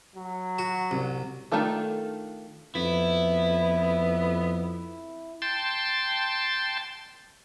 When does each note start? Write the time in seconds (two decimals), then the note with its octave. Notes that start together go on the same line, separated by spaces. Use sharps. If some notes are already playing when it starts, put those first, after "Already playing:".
0.15 F#3
0.59 F#4
0.91 C2
1.52 D#3 A3 D4 F4 A4
2.75 F2 B3 E4
5.42 G5 A5 C6